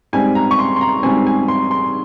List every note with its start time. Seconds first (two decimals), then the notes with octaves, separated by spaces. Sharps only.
0.13 G#2 G3 C4 G#5
0.35 A#5
0.51 C#6
0.59 C6
0.76 C6
0.81 A#5
1.03 G#2 G3 C4 G#5
1.27 G#5
1.48 C6
1.71 C6